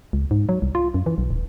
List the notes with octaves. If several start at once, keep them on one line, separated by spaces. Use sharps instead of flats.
C#2
G#2
F#3
C2
F4
F#2
E3
B1
D#1